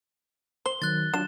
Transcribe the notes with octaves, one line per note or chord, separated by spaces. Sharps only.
C5 G7
D#3 F#3 F#6 A6
F#3 D4 F4 E7